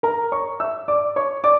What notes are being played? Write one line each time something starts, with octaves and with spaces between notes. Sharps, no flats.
A#4 A#5
C#5 C#6
E5 E6
D5 D6
C#5 C#6
D5 D6